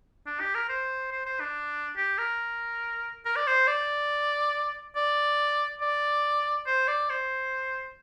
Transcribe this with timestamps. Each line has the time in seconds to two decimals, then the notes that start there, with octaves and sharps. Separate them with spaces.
0.27 D4
0.40 G4
0.55 A#4
0.69 C5
1.12 C5
1.26 C5
1.41 D4
1.97 G4
2.18 A#4
3.26 A#4
3.36 D5
3.47 C5
3.68 D5
4.96 D5
5.82 D5
6.67 C5
6.88 D5
7.10 C5